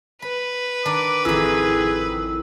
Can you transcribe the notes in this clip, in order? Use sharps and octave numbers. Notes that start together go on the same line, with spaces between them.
B4 B5
D#3 D4 D6
A1 F2 D#3 E4 G#4 E6